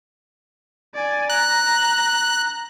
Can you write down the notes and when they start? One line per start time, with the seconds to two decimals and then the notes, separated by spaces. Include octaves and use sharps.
0.94 D5 G#5
1.30 A#5 F#6